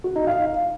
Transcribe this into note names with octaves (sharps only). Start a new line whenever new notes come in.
F#4
D#4
F5